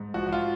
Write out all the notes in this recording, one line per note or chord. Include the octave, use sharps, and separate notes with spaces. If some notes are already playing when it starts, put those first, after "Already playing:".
Already playing: G#2
F3 F#4
F#4
F4